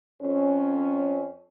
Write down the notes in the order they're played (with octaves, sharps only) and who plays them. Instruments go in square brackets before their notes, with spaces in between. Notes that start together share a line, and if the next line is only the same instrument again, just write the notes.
[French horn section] F2 C#4